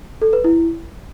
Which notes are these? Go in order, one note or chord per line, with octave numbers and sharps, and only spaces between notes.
A4
B4
E4